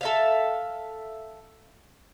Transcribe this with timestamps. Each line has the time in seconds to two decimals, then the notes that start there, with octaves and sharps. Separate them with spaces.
0.01 A4 E5 F5